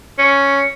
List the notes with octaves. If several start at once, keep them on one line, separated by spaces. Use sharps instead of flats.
C#4